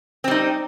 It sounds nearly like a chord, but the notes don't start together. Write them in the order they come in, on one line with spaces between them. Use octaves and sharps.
C4 G3 D#4